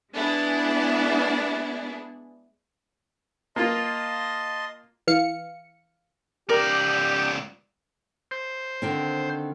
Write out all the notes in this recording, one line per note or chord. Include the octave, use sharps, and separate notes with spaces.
G#3 B3 D4 E4 G#4
A#3 F4 D#5 A5 C6
E3 F5 C#7
C#2 G4 A#4 D5
C5
D3 D#3 C4